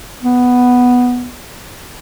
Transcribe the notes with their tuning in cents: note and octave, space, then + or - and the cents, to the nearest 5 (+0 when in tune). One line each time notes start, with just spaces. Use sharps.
B3 +0